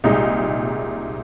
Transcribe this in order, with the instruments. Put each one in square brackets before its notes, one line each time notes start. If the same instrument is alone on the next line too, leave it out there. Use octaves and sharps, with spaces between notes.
[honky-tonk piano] C2 A#2 G#3 D#4